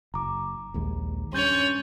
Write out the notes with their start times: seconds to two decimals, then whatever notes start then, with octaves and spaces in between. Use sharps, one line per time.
0.14 F#1 A#5 D6
0.74 A#1 D#2 G#3
1.33 G2 C#4 C#5 C6 G6 A6